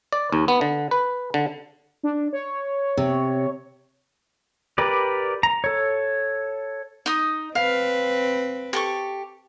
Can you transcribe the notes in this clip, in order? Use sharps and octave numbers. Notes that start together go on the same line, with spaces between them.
D5
D#2
B3
D3
B4
D3
D4
C#5
C3
G4 A#4 B4 D5
A#5
A4 C#5
D#4 D#6
C4 B4 F5
G4 A4 C#6